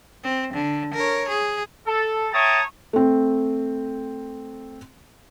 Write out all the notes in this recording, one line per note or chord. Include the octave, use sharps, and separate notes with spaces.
C4
D3
A#4 C#5
G#4
A4
C#5 E5 G5 A5 A#5 D#6
A3 C4